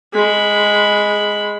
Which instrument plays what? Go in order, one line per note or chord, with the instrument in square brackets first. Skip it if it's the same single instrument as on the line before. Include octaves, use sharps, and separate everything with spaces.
[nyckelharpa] G#3 B5